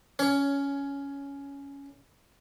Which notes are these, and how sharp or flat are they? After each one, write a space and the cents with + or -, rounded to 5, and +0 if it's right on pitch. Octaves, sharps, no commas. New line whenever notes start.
C#4 +10 C#5 +25